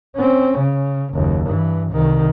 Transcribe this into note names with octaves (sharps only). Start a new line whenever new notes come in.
C4 C#4
C#3
F#1 D#2
G2 E3
C2 D#3